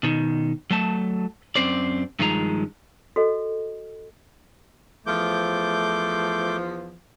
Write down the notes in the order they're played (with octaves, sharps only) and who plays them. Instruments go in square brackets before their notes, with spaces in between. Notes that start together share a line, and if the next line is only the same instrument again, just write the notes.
[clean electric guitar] B2 D#3
F#3 A3 A5
F#2 C4 C5 D5
G2 D#3 F3 G#3 A#5
[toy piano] F#4 A4 D#5
[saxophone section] E2 F3 [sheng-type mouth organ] A3 D6 G6